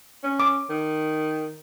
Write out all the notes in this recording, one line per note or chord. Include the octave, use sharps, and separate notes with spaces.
C#4
D6
D#3